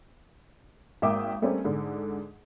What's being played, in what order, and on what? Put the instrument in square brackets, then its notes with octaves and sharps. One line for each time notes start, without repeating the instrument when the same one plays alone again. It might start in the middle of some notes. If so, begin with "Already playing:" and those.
[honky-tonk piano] G#1 A#3 E5 G5 D6 D#6
G3 A3 A#3 C4 C#4 G#4
G#2 D3